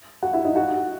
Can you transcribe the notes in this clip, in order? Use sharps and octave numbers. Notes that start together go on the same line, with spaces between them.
F#4 F#5
E4 E5
D#4 D#5
F#4 F#5